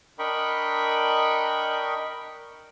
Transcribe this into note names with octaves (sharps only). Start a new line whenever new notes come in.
D4 A#4 D#5 G5 B5 C#6